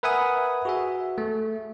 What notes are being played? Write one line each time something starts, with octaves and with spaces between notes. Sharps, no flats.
A#4 B4 E5 F#5 G#5 D#6
F#4 G#4 E5
A3